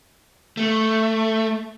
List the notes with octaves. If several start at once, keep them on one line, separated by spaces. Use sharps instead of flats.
A3